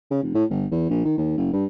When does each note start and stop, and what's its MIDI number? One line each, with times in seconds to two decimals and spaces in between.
0.11 0.20 49
0.23 0.34 29
0.34 0.44 45
0.51 0.66 31
0.71 0.85 40
0.89 1.04 34
1.05 1.17 51
1.18 1.35 39
1.37 1.49 30
1.53 1.65 43